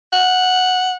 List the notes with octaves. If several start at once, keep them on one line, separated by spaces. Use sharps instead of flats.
F#5